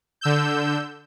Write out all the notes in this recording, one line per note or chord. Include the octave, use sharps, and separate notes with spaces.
D3 E6 G6